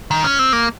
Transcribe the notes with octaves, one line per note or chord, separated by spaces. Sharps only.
D#3
C#4
C4
A#3